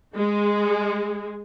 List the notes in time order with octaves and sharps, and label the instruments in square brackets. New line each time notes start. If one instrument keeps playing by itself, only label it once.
[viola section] G#3